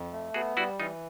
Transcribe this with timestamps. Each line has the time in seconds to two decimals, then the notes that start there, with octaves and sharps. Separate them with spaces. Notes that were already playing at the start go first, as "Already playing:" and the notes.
Already playing: F2
0.12 A3
0.34 B3 F#4 G#4
0.57 G3 E4 F#4
0.80 E3 D#4 F4